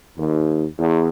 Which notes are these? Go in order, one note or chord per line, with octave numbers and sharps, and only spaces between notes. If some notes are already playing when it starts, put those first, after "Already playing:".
D#2
E2